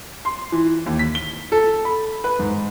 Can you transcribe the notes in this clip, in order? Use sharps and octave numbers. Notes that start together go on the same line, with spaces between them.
C6
E3
D#2
B6
G7
A4
B5
B4
G#2